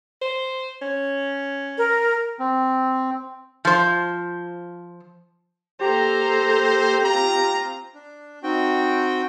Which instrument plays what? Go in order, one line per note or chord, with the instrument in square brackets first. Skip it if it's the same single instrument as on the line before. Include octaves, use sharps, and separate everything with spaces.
[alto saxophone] C5
C#4
[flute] A#4
[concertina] C4
[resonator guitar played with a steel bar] F3 C5
[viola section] A#3 A4 A#5 [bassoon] G4 [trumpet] C5
[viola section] C4 F4 [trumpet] A#5
[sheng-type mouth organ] D4
[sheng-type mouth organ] C4 F#4 G5 [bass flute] D#4